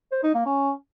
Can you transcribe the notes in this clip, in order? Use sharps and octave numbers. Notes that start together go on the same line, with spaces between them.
C5
D#4
A#3
C#4